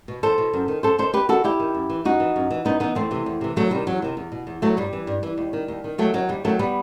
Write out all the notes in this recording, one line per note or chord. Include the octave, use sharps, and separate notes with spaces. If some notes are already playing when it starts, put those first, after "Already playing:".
B2
E2 A4 C5
B2
F#2
D#3
F#2 A4 C5
D#3 A4 C5
D#2 G4 B4
D#3 F#4 A4
D#2 E4 G4
D#3
F#2
E3
F#2 D#4 F#4
E3
F#2
E3
F#2 B3 D#4
E3 B3 D#4
E2 A3 C4
C3 E3
E2
C3 E3
E2 F#3 A3
C3 D#3 G3
E2 F#3
C3 D#3
E2
B2
E2
B2 F#3 A3
G2 G3
E3
G2
E3
D#2
D#3
D#2
D#3
D#2 F#3 A3
D#3 F#3
D#2 G3
D#3 F#3 A3
G3 B3